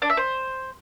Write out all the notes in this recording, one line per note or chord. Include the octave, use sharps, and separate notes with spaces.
D4
E5
C5